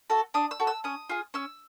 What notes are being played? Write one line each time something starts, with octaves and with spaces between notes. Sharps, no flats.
F#4 A4
D4 D#6
E6
F#4 A4
E6
C#4 D#6
F4 G#4
C#4 E6